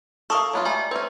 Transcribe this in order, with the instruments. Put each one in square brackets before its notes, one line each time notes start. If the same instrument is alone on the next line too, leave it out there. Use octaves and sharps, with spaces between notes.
[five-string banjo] A4 A#4 F5 [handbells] C#6 D#6
[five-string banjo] F#3 B3 F4
[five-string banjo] G3 A3 [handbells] E5 G#5 A#5
[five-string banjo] C4 C#4 [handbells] B4